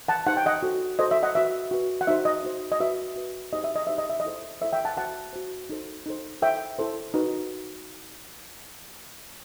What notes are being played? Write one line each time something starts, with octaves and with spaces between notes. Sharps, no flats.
F#5 A5
D#4 G4 C5 F#5
G5
D#5 F#5
F#4 A4 C5
F#4 A4 C5 D#5
E5
D#5 F#5
F#4 B4 E5
F#4 B4
F#5
D#4 F#4 C5 E5
D#5
D#4 F#4 C5
D#5
F#4 B4 E5
F#4 B4
D#4 G4 C5 D#5
E5
D#5
D#4 G4 C5 E5
D#5
E5
D#5
E4 A4 C5
E4 A4 C5 E5
E5 G5
F#5 A5
F#4 C5 F#5 A5
F#4 C5
D#4 A4 C5
D#4 A4 C5
E4 A4 C5 E5 G5
E4 A4 C5
D#4 F#4 B4